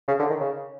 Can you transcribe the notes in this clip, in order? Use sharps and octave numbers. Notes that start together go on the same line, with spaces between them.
C#3
D3
D#3
C#3